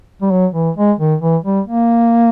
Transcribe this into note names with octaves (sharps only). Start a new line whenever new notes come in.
G3
F#3
E3
G#3
D#3
E3
G3
A#3